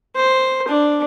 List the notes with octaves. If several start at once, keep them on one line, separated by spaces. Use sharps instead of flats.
C5
D4